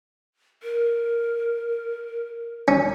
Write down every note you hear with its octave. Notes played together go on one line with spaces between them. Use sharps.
A#4
C#4